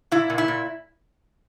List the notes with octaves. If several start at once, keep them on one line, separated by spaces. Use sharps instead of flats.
A#2 E4
A#2
E4
A#2